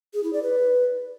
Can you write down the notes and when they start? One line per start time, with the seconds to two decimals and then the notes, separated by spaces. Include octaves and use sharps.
0.14 G#4
0.23 E4
0.33 D5
0.43 B4